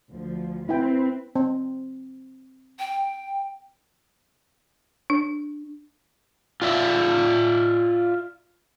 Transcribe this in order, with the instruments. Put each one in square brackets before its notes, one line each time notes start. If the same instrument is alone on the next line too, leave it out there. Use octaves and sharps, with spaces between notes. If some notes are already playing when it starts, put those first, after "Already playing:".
[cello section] D2 F3
[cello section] C4 B4 [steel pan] E4 G5
[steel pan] C4
[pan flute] G5
[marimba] D4
[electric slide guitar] F4 D5 E5